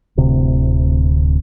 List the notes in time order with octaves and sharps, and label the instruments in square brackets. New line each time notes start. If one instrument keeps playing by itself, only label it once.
[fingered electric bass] D1 D2 C3